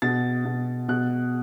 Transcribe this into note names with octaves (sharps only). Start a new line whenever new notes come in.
B2 A6
B2
B2 F#6